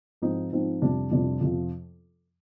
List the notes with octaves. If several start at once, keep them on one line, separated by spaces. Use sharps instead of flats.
G#2 F3 C4 D#4
G#2 F3 C4 D#4
F2 C3 G3 D4
F2 C3 G3 D4
F2 C3 F3